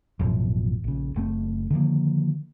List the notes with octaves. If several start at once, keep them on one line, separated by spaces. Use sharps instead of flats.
A1 F#2 B2 F3
A#1 C#3
F#1 A3 C4
D3 D#3 F3 A#3